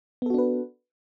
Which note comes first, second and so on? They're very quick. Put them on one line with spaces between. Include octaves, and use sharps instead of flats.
B3 A4 F#4 D4 B4